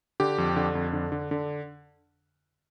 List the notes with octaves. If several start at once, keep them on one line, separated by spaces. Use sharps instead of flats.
D3 G4
F2
D3
F2
D3
D3
D3